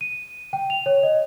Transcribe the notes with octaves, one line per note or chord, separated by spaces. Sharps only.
D#7
G5
F7
C#5
D#5